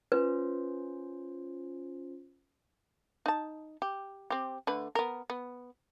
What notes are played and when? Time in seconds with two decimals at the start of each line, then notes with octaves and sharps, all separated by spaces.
0.12 C#4 F4 B4 C5
3.26 D#4 A5
3.82 G4
4.30 C4 G4
4.67 D3 A3 B4
4.95 B3 A#4
5.30 B3